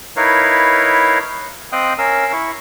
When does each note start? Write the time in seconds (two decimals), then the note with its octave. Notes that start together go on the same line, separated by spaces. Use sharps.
0.17 D#4 E4 A#4 B4 C#5 F5
1.72 C4 D#5 F5 G5 D#6 F#6
1.98 C#4 A#4 F5 E6
2.33 E4 C#6